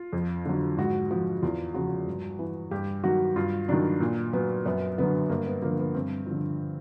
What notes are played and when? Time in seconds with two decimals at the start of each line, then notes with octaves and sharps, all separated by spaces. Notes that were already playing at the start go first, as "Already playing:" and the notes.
Already playing: F4
0.13 F2
0.46 D3 F#3
0.77 G#2 F#4
1.11 F3 F#4
1.42 E2 F4
1.74 C#3 F3 F#4
2.07 G2
2.39 E3
2.71 G2 G4
3.04 D#3 F#3 F#4
3.36 G2 F4
3.68 D#3 F#3 D4
4.00 A#2
4.33 F#3 B3
4.65 F#2 B3
4.98 D3 F#3 B3
5.29 G2 A#3
5.46 B3
5.62 D3 F3 A#3
5.79 B3
5.94 G2 C4
6.26 D3 F3